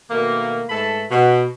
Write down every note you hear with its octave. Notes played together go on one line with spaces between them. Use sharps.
B2 D#3 A3 A#3
G#2 A3 A4 B4 A5 B5
B2